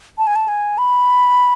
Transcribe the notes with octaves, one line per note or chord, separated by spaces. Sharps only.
A5
G#5
A5
G#5
B5